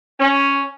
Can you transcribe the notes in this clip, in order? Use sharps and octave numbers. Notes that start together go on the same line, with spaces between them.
C#4